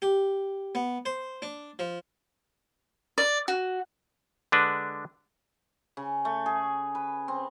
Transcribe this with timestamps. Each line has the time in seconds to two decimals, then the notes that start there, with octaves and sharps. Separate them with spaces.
0.02 G4
0.75 B3
1.05 C5
1.42 D4
1.79 F3
3.18 D5
3.48 F#4
4.52 D3 G#3 D4 B4
5.97 C#3
6.25 A3
6.46 G#4
6.95 B4
7.28 C4